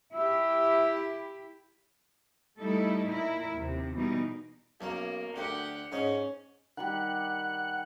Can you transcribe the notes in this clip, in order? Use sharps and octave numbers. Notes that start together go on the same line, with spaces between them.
E4 G4 E5
G3 A3 D#4 E4 A4
A#2 E4 A#4
D#2 C3
B2 E3 G3 A#3 D#4
B1 A#3 C#4
D2 D3 G4 F#5
G#2 C#4 D#4
D#3 G3 G4 F#5